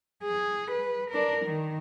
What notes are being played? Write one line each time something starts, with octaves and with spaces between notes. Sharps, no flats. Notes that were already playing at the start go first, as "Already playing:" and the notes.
G#4
B4
D4 A#4
D#3